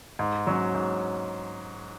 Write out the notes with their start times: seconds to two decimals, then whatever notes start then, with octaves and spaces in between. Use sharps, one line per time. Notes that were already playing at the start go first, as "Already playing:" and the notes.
0.19 G#2
0.47 F#3 C#4
0.75 G#2